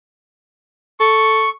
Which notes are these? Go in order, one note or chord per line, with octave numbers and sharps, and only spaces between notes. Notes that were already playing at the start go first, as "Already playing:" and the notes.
A4 C#6